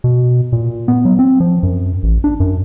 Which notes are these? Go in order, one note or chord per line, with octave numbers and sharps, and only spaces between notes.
B2
A#2
B3
F#3
C4
F3
F#2
A1
D4
F#2